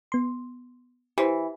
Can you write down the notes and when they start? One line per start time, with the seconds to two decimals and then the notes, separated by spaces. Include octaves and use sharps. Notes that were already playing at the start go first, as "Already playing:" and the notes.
0.12 B3 C6
1.18 E3 G4 C5